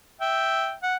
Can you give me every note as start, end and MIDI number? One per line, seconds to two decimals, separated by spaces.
0.21 0.73 76
0.21 0.73 79
0.83 0.96 78